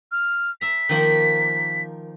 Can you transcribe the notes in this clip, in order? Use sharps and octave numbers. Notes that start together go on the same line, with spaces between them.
F6
E5 A#5 B6
D#3 F3 A#3